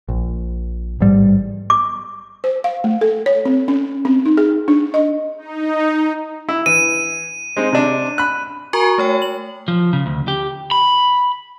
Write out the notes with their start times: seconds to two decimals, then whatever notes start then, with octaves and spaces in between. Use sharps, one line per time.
0.09 A#1
1.00 A1 G#2 G3
1.70 D6
2.44 C5
2.64 F5
2.84 A3
3.01 A4
3.26 C#5
3.45 C4
3.68 C#4
4.05 C4
4.26 D#4
4.37 G#4
4.68 D4
4.94 D#5
5.38 D#4
6.49 E4
6.66 E3 D#7
7.57 G#3 C4 D#4
7.72 C3 D4
8.18 B5 F#6
8.73 F#4 A#4 G#5 A#5 C#6
8.98 A3 C#5 G5
9.22 F#7
9.68 F3
9.93 C#3
10.06 D2
10.28 G4
10.71 B5